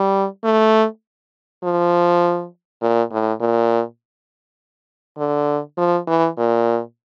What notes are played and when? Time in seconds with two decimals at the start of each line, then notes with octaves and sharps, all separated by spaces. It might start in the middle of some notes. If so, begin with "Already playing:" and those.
Already playing: G3
0.44 A3
1.63 F3
2.82 A#2
3.12 A2
3.41 A#2
5.18 D3
5.78 F3
6.07 E3
6.38 A#2